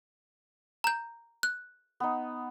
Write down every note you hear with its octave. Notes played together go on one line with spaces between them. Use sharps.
A#5 G6
F#6
B3 D#4